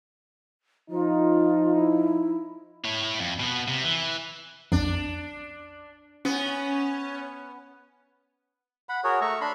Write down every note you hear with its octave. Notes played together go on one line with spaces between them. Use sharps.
F3 D#4 F4
E4
E4 C#5
F2
B2 B3
C3
E3
A#1 F2 D4
B3 C#4
F#5 B5
F#4 G#4 A#4 C#5
A3 E5 A#5 C#6
D4 B5 C6